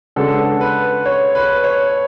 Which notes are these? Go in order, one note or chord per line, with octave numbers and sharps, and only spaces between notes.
C#3 G#3 B3 D4 F#4 A4
B4
C#5
B4
C#5